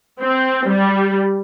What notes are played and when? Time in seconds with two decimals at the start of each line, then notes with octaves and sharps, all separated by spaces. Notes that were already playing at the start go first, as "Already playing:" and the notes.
0.20 C4
0.69 G3